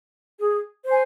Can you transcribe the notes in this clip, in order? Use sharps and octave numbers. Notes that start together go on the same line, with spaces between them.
G#4
C5 G#5